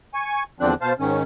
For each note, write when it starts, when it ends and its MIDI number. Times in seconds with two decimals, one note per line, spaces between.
0.14 0.43 80
0.14 0.43 85
0.60 0.74 40
0.60 0.74 50
0.60 0.74 53
0.60 0.74 60
0.60 0.74 62
0.60 0.74 90
0.82 0.93 47
0.82 0.93 72
0.82 0.93 77
0.82 0.93 81
0.99 1.23 44
0.99 1.23 51
0.99 1.23 61